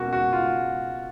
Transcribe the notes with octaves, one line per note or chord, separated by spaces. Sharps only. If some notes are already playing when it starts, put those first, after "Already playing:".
Already playing: B2 A#3 C#4 F#4
F#4
F4